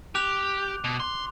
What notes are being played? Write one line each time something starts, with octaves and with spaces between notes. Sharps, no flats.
G4 D6 F#6 F7
B2
C6